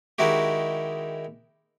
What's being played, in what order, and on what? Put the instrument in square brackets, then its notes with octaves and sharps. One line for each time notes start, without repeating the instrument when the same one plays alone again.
[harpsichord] D#3 G#3 D#4 E4 F#4 G4